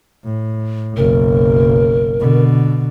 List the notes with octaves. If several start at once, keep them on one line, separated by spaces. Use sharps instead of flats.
A2
F#1 B1 A#4
B2 D3